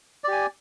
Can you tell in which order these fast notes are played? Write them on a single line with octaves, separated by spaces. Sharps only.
D5 G4 G#5